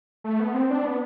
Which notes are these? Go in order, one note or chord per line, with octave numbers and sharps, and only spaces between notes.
A3
B3
C4
D4
B3